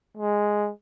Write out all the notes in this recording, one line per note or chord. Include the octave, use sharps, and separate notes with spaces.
G#3